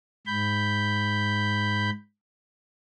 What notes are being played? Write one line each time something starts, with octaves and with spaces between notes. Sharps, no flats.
G#2 B5 G6